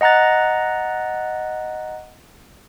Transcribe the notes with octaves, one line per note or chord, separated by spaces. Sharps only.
D#5 F#5 A#5 F#6 A6